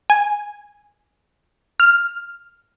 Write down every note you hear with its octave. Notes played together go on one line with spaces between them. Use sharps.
G#5
F6